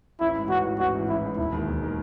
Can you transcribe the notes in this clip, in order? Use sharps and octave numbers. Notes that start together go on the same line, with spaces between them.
A1 E4
G#2 E3
A1 F#4
G#2 E3
A1 F#4
G#2 E3
A1 E4
G#2 E3
E1 E4
D#2 D#3 G#3
E1
D#3 G#3